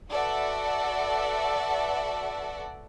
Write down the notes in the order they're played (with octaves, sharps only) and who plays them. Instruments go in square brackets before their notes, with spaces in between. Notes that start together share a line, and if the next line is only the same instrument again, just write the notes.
[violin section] F#4 A4 B4 D5 E5 F#5